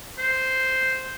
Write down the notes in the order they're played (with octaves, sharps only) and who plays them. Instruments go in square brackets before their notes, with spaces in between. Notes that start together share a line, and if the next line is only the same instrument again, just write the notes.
[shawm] C5